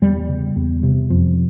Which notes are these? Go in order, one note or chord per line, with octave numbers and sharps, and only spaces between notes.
E2 G3
C#3
E2
C3
F2